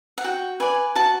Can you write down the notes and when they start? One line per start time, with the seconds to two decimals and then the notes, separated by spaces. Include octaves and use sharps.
0.18 F#5
0.24 F#4 G5
0.60 B4 D5 G#5
0.95 F#4 A5